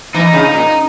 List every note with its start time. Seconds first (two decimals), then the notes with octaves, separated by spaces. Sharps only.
0.14 E3 D#4
0.33 C#3
0.44 D#4
0.54 A#2